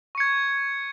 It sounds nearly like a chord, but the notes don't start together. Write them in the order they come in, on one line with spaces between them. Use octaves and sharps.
C#6 C#7 G#6